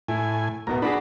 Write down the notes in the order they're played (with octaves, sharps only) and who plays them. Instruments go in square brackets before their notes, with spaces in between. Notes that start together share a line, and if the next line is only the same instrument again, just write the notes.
[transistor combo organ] A2 G#5 [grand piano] E4
[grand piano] D1 B2 B3 [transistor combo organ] A#4
[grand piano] D4 F#4 G#4 [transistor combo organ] B5